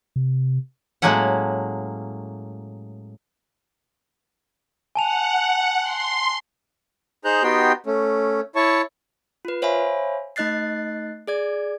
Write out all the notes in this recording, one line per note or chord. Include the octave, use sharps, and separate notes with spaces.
C3
A2 F#3 G#3 A#3 C#4 F#5
F#5 G#5 A5 F7
C6
D#4 G#4 C5 A#5 F#6 G6
B3 D#4 F#4 G4 G5 C6
A3 C#4
E4 C#5 A5 C#6
F4 B4
C5 C#5 E5 F5 G#5 B5
A3 D#4 D#5 F#6 A6 C7
G#4 D5 G#6